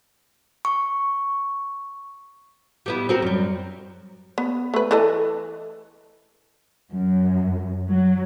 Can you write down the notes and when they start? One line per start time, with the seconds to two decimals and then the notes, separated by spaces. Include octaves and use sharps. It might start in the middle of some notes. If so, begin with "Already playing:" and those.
0.65 C#6
2.86 G3 B3 E4
3.09 C4 F#4 A#4
3.22 F#2 G3
4.38 B3
4.74 A3 B4
4.91 E3 A4 D#5
6.92 F#2
7.90 F#3